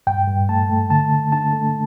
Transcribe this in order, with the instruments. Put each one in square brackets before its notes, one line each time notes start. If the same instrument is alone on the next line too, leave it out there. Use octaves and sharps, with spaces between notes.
[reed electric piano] G2 G5
G2
A3 A5
A3
D3 A5
D3
D4 A5
A3